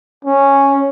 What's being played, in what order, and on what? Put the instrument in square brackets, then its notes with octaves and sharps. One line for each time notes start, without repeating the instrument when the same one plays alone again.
[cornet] C#4